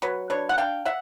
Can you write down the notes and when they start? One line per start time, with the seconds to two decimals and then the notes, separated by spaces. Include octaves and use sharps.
0.02 F#3 B4 C#5
0.30 D4 B4 C#5
0.49 F#5
0.58 D4 F5 G5
0.85 E5 F#5